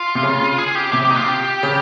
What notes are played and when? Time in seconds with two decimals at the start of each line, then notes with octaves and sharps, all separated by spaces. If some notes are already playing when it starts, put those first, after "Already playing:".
Already playing: F4
0.15 C3
0.23 C#3
0.58 G#4
0.75 G4
0.93 C3 G4
1.05 G4
1.11 D#4
1.16 F4
1.28 G4
1.63 C#3